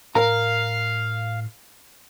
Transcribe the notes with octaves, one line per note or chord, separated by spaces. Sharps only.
A2 A#4 F5 A#5